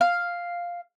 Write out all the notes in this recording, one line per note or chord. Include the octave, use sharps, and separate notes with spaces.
F5